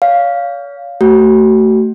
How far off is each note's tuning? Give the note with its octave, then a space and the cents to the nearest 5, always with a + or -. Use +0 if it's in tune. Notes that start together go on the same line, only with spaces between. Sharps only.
C#5 +40 F5 +0
A3 +10 F#4 +35